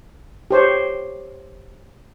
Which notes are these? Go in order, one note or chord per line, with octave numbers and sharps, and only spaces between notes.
G4 C5 C#5